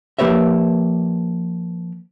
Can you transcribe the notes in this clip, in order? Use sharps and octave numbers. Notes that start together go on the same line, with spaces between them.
F3 A#3 G4 B4 C#5 E5